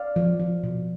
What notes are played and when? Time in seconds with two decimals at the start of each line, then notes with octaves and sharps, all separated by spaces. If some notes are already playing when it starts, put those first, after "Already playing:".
Already playing: D5 F5
0.16 F3
0.40 F3
0.64 B2